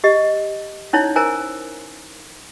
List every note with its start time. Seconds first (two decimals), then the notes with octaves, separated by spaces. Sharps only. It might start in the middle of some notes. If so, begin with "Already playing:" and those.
0.04 G4 D#5
0.93 C#4 D#4 E4 C#5
1.16 A#4 C5 G#5 A#5